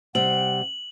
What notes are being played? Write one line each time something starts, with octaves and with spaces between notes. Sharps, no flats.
C3 G3 F#5 F#7